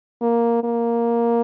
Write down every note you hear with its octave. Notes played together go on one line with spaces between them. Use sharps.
A#3
A#3